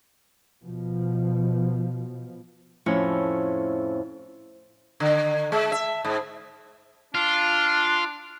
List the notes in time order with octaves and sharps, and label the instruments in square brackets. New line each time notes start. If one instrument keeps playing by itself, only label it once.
[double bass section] B2 F3
[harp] F2 A2 C#4 E4 C#5 E6
[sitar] D3
G#3
E5
G#2
[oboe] D4 [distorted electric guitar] F4